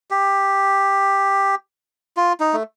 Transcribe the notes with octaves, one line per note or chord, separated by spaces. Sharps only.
G4
F4
D#4
A3